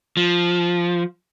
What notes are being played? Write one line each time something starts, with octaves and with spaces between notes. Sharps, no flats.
F3